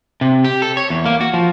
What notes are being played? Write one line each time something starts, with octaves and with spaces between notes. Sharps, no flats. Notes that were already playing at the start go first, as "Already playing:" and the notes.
C3
G4
A4
C#5
E2
A#3
F#4
F3